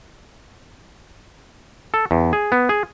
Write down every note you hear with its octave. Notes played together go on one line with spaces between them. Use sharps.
A4
E2
G#4
B3
G#4